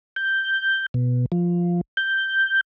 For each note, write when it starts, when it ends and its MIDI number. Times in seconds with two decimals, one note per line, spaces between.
0.16 0.86 91
0.94 1.26 47
1.32 1.81 53
1.97 2.61 91